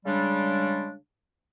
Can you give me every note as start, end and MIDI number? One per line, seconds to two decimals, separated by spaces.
0.06 0.94 49
0.06 0.94 55
0.06 0.94 56
0.06 0.94 62